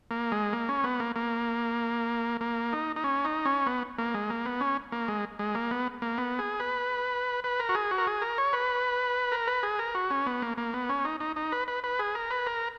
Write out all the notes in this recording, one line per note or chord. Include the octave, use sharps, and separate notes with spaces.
A#3
G#3
A#3
C#4
B3
A#3
A#3
A#3
D#4
D#4
C#4
D#4
C#4
B3
A#3
G#3
A#3
B3
C#4
A#3
G#3
G#3
A#3
B3
A#3
B3
G#4
B4
B4
A#4
F#4
G#4
F#4
A#4
G#4
A#4
C#5
B4
A#4
B4
G#4
A#4
F#4
C#4
B3
A#3
A#3
B3
C#4
D#4
D#4
D#4
B4
B4
B4
G#4
A#4
B4
A#4